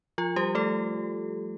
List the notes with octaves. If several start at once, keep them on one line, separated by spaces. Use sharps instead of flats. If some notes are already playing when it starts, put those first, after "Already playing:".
F3 F4
G3 G4
A3 A4